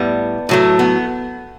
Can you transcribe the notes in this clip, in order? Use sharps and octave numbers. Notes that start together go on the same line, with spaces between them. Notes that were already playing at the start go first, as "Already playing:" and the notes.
Already playing: A2 G3 B3
A2 F#3 A3
B3